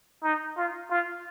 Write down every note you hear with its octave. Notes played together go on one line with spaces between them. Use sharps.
D#4
F4
F4